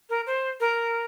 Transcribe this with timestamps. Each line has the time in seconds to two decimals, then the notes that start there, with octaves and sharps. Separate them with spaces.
0.10 A#4
0.27 C5
0.60 A#4